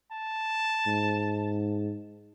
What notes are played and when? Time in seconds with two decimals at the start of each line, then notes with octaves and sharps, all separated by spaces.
0.12 A5
0.87 G#2